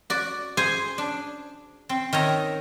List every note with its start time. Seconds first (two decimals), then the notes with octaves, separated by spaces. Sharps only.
0.10 F#4 D5
0.57 G#4 C5 G#5
0.98 D4
1.89 C4
2.13 D#3 C#5 E5 A#5